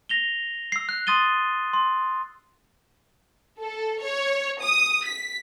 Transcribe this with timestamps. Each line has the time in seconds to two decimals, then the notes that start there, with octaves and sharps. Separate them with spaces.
0.09 A#6 F7 G7
0.72 E6 C7
0.89 F#6
1.07 C6 D#6 A6 D#7 G7
1.73 C6
3.60 A4
4.03 C#5
4.61 D#6
5.06 B6